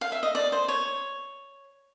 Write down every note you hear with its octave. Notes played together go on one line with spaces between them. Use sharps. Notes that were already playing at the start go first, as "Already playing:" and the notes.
F5
E5
D#5
D5
C5
C#5